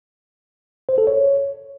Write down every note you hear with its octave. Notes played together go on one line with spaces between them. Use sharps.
C5
A4
C#5